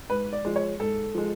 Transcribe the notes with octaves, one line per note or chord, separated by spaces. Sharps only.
G#2 B4
D5
F3 G#3
C#5
G#2 A4
F3 G#3